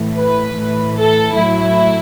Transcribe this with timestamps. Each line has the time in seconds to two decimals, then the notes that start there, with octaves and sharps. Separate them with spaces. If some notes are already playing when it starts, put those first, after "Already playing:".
Already playing: A2 E3
0.15 B4
0.55 A2 E3
0.96 A4
1.35 A2 F#3 E4